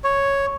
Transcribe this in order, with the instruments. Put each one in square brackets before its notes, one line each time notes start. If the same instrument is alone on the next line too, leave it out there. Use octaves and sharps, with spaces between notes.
[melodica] C#5